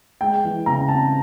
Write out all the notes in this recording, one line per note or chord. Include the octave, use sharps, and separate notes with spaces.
G#3 G5
E3
C#3 A#5
C4 A5